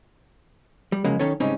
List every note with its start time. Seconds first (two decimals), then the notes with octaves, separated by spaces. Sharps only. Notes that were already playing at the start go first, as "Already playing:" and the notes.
0.92 G3
1.04 F2 C#3 F#3 G#3 A#3
1.19 B1 D#3 C#4 A4 C#5
1.40 G#2 C#3 G3 C4 C#4 D#4